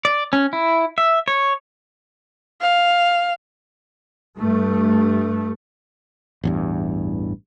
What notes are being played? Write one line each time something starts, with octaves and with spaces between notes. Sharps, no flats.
D5
C#4
E4
E5
C#5
F5
G2 A3
A1 E2 G2